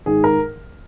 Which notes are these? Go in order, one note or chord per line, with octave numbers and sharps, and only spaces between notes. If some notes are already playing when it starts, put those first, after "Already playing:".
G#2 D#3 G#4
A#4